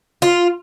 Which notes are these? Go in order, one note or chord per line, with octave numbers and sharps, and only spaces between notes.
F4